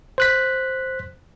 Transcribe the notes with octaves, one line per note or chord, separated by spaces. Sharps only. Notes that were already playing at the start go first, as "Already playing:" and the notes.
C5 F#6 B6